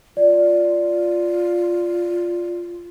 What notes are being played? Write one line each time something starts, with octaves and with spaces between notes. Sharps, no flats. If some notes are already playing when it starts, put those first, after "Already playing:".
F4 D5